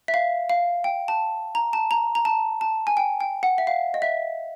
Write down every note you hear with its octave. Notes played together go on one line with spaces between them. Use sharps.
E5
F5
F5
G5
A5
A#5
A5
A#5
A#5
A5
A5
G#5
G5
G5
F#5
E5
F5
D#5
E5